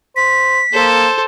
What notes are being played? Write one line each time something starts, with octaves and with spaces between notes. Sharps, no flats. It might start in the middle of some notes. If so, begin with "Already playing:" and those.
C5 B6
A#3 A4 C5